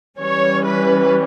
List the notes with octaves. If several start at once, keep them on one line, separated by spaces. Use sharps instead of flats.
E3 G3 C#4 C#5
B4